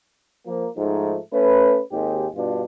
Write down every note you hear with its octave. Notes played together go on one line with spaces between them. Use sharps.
F3 A#3
G#2 F3 A3 D#4
A3 C#4 B4
G#1 D#2 G#3 G4
G2 B2 D4 F4